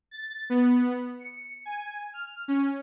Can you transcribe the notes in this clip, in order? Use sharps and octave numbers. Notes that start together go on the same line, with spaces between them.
A6
B3
C#7
G#5
F6
C#4